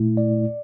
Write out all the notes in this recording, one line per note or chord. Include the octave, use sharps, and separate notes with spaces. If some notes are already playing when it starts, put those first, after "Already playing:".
Already playing: A#2 A3 E4
D5